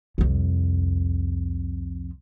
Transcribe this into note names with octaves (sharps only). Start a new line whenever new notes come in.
C2 F2